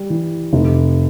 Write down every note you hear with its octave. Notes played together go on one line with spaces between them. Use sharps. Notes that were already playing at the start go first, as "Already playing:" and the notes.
Already playing: G3
E3
F1